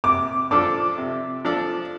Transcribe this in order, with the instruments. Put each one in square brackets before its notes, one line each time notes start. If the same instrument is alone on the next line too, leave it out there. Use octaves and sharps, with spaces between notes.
[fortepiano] C3 [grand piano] D6
[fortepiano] F3 D4 A4 D5 [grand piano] D6
[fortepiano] C3
F3 D4 A4 D5